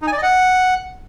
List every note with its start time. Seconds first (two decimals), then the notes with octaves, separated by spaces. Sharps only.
0.02 D#4
0.07 G#5
0.12 D5
0.17 D#5
0.23 F#5